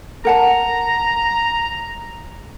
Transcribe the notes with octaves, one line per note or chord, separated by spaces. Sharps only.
A#4 F#5 A5 A#5